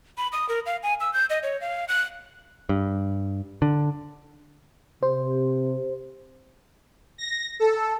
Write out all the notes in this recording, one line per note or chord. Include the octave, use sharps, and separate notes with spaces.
B5
D#6
A#4
F5
G#5
E6
G6
D#5
C#5
F5
F#6
G2
D3
C3 C5
A#6
A4